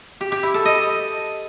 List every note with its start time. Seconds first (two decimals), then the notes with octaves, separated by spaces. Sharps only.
0.21 G4
0.32 G4
0.43 E4
0.54 A4
0.65 D#5